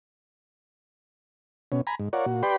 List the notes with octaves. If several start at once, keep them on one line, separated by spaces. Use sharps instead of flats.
B2 C#4
G#5 A#5 B5
G#2
F4 A#4 C#5 D5 F#5
A#2 F#4
G4 B4 D5 G5 B5 C6